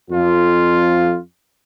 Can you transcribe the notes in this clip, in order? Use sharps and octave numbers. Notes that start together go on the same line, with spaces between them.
F2 F4